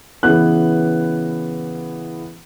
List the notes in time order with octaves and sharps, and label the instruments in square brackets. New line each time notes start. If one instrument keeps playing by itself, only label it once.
[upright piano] C#3 E3 B3 F#6